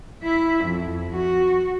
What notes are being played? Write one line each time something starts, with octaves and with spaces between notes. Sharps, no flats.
E4 E5
F2
F#4